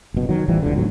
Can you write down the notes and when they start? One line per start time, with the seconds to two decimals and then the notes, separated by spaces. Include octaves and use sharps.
0.14 F#1 B2
0.29 D#3 F#3
0.48 A1 E3 F3 G3
0.62 F1 C#2 D3
0.76 D2 G#2 B2 F#3